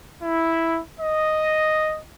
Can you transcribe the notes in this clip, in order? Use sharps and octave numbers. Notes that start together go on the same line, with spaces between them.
E4
D#5